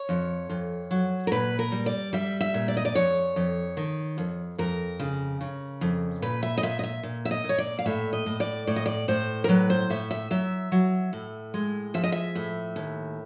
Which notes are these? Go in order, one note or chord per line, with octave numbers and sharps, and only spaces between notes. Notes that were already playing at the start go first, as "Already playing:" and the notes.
Already playing: C#5
F2
F2
F#3
A#4
A#2 B4
A#4
G3
D5
G3 E5
E5
A#2
D5
D#5
D5
F2 C#5
F2
D#3
F2
F2 A#4
C#3
C#3
F2
A#2 B4
E5
D#5
A#2 E5
D#5
E5
A#2
E5
D#5
A#2
C#5
D5
F5
A2 E5
D#5
A2
D5
A2 D5
D#5
D5
A2 C5
A#4
F#3 B4
C5
A2 E5
E5
F#3 E5
F#3
A2
G#3
F3 E5
D#5
E5
A2
D#2